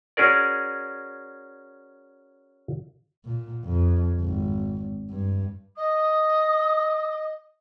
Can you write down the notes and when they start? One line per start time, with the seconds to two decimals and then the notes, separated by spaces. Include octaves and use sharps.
0.17 C#4 F#4 G#4 A#4 D5
3.25 A#2
3.65 F2
4.21 G#1
5.10 G2
5.77 D#5 D#6